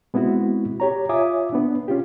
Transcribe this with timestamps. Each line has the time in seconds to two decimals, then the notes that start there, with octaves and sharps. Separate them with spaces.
0.14 G#3 B3 C4 E4 F#4
0.80 G4 C#5 A#5
1.09 F4 C#5 E5 G#5 D6 D#6
1.53 B3 D4
1.88 C#4 F4 G4